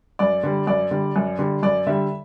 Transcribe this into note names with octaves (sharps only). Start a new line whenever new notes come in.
F#2 D5
D3 G3
F#2 D5
D3 G3
F#2
D3 G3
F#2 D5
D3 G3 E5